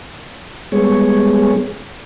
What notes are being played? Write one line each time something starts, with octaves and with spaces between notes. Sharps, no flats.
G3 G#3 B3 G#4 C#5